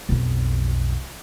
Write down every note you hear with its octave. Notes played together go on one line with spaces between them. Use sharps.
B1 F2